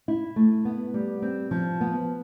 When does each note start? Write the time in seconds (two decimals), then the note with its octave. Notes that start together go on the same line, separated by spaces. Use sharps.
0.08 E4
0.36 A3
0.65 B3
0.94 G3
1.22 C4
1.51 F3
1.81 B3